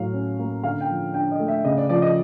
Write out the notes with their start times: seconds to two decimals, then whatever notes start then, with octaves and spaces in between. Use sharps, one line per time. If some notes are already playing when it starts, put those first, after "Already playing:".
Already playing: A2 F#3 F5
0.13 C#4
0.39 A#3
0.64 D3 F5
0.81 G5
0.89 F3
1.14 D4 G5
1.31 D#5
1.40 A3
1.48 E5
1.64 C#3 D#5
1.77 D5
1.89 F3 D5
2.02 D#5